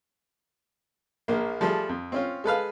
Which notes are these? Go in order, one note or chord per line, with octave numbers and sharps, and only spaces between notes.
A#1 A#3
F3 G3 A3 G#4 A4
F2
C4 C#4 F4
G#3 A4 B4 F5